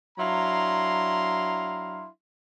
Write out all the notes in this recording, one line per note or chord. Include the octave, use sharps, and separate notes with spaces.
F#3 D4 E4 F5 A#5 C6